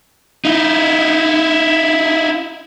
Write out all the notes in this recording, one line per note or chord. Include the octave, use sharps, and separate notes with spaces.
D#4 E4